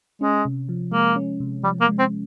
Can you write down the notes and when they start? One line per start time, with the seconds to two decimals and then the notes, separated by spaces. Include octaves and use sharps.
0.21 G#3 C#4
0.45 C3
0.69 F3
0.92 G#3 A#3
1.16 C#4
1.40 C3
1.64 F3 G3
1.81 A#3
1.87 G#3
1.99 C4